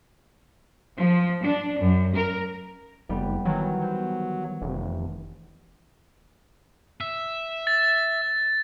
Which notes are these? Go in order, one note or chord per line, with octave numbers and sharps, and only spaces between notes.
F3
D4
F#2
A#4
F#1 G3 B3
D#3 E3 F#3 B3
C5
F1
E5
A6